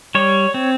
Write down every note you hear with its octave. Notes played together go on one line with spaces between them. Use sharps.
G3 C#5
C4